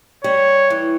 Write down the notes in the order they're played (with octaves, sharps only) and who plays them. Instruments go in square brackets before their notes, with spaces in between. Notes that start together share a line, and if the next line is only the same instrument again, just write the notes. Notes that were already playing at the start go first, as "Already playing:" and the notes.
[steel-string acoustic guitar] G3 [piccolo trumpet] C#5
[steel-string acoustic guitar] E3